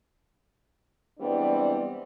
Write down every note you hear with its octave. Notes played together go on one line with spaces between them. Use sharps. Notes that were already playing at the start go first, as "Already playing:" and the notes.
E3 G3 G#3 B3 C4 D4